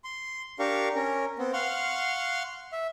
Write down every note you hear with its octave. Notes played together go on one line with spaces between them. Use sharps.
C6
D4 G4 A#4 F5 C#6
C#4 A#4
B3 C4
F5 F#5 C6 C#6 F6
E5